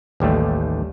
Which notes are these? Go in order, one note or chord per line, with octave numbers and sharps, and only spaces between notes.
A1 D#2 G3 A3